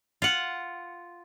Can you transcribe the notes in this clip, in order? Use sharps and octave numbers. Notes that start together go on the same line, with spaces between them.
F4 F#5